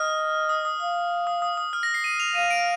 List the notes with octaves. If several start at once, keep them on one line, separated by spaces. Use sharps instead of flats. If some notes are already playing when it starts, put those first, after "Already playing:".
Already playing: D#5 F6
D#6
D#6
F5 D#6
D#6
D#6
D#6
F6
A#6
C7
D#7
F7
F5 D#7
D7